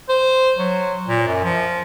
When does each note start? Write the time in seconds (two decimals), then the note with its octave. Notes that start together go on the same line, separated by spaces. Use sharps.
0.09 C5
0.58 F#3
1.07 A#2
1.27 F#2
1.44 F3